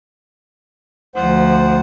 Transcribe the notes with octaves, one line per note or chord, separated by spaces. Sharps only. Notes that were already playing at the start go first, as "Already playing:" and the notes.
D2 F3 C5 F#5